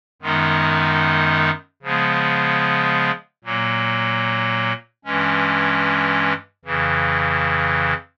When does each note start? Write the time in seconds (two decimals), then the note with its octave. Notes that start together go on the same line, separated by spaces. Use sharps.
0.22 F#2 D#3 G#3 B3 D#4
1.82 C#3 F3 G#3 B3
3.44 A#2 F#3 A#3
5.05 G2 E3 G#3 C#4
6.65 F2 C#3 E3